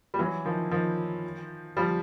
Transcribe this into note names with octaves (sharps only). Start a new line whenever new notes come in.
G3
E3 F#3
D#3 F3
D#3 F3
F3 G3